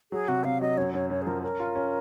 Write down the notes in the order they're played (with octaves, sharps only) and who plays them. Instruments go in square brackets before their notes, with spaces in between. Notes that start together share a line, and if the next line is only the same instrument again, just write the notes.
[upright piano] F#3 [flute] G#4
[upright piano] C3 [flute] F#4
[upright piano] C3 [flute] F5
[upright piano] F#3 [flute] D#5
[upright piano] F#2 [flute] C#5
[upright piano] F#2 [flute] C#5
[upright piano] F#2 [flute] C#5
[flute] G#4
[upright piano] F3 [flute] A#4
[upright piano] C#4 [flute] A#4
[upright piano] F4
C#4